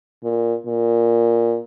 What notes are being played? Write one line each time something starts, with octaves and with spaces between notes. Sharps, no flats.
A#2
A#2